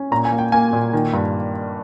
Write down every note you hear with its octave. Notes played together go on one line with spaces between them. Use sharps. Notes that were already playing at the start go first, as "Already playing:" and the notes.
Already playing: C#4
A#2 A#5
G#5
A#3
G5
A#3 G#5
A#2
D#3
G2